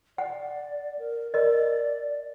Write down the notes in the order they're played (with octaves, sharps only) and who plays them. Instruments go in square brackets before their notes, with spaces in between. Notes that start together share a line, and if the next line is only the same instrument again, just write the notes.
[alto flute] D5 [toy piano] F#5
[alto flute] A#4
[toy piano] A#4 D#5 [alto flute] D5